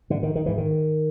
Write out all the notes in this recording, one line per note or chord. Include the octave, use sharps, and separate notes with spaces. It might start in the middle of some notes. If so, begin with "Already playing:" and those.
G#2 D3
D#3
D#3
G#2 E3
D#3